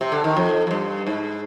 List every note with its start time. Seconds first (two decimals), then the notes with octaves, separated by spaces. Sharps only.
0.01 C3
0.12 D3
0.24 D#3
0.37 F2
0.67 F2
0.71 G2
1.07 G#2